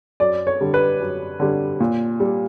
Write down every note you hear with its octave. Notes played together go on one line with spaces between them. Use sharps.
F#2 D5
C#5
D3 G3
B4
F#2
D3 G3
A#2
G3